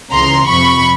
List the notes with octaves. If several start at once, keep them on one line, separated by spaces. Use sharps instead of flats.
C#2 C#3 E3 A#5 C6
F2 C3 F3 B5 C#6